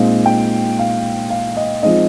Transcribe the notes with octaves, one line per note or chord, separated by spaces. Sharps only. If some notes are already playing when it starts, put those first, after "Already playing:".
Already playing: A#2 G#3 C4 D#4 F5
G5
F5
F5
D#5
F3 G#3 C4 D#4 D#5